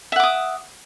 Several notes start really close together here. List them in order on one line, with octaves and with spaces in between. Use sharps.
E5 F#5 D6 D#6